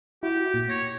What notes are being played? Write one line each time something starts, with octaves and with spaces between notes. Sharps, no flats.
E4 F#4 G4
A#2
C#5 A#6